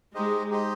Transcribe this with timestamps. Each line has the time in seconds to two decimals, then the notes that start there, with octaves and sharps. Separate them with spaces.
0.15 G#3 D#4 G4 C5 D#5
0.50 D#4 G4 C5 D#5